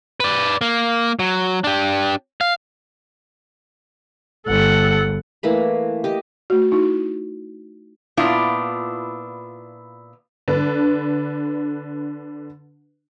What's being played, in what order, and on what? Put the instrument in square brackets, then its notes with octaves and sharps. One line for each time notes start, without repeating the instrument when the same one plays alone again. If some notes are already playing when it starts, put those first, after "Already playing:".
[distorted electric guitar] B4 D5
A#3
F#3
D4 G4
F5
[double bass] G1 [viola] A4 F#5
[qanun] E3 A3 A#3 B5
G4 D#5
[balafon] A3 F#4
D#4 E4 F#4
[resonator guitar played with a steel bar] A#2 B3 D4 E4 F4
[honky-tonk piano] D3 D4 B4